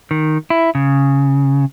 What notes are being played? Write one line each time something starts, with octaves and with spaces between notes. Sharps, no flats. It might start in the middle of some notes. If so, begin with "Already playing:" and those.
D#3
E4
C#3